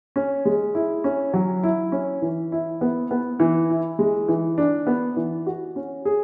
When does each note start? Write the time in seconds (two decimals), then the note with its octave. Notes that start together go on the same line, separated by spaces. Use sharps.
0.16 C#4
0.45 G#3
0.75 E4
1.04 C#4
1.33 F#3
1.63 E4
1.92 C#4
2.22 E3
2.52 E4
2.81 B3
3.11 B3
3.40 E3
3.70 E4
3.99 G#3
4.28 E3
4.58 D4
4.87 B3
5.16 E3
5.47 F#4
5.76 C#4
6.05 G#4